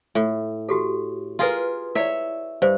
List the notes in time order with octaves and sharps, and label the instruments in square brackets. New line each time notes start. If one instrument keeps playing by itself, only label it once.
[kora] A2
[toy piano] F#4 G4 A4
[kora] F4 G#4 A#4 [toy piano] B4 C6
[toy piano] E4 D5 [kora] C#5 E5
[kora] G2 [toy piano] C5